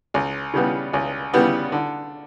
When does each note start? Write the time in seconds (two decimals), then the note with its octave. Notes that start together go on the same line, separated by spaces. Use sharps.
0.14 C#2
0.54 C#3 G3 B3
0.93 C#2
1.33 C#3 G3 B3
1.72 D3